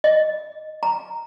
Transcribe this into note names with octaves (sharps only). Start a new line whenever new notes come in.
D#5
A#5